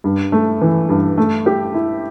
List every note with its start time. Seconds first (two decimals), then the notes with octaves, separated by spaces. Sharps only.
0.04 G2
0.32 A3
0.61 E3
0.89 G2
1.18 A3
1.46 G4
1.74 E4